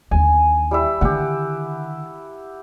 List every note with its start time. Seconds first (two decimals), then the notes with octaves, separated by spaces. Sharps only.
0.11 D#2 D3 G#5
0.71 G3 E4 E5
1.01 D3 D#3 G4 F#5